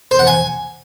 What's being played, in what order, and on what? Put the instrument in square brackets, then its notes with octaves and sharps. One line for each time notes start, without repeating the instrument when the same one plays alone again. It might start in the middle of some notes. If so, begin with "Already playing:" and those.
[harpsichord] C5
F#5
G#5